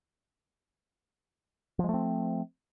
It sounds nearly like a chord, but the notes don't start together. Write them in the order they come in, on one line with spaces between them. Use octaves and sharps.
F3 G#3 A3 C4